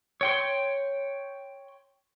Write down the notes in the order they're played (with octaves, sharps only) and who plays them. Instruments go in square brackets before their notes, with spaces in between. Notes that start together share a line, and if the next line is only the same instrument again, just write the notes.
[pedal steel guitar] C#5 G5 C6